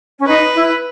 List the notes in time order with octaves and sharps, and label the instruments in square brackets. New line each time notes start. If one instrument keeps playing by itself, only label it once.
[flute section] C#4
[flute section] D#4 [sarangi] B4
[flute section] E4